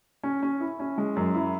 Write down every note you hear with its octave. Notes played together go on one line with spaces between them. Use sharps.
C#4
C#4
E4
C#4
G#3
F#2
E4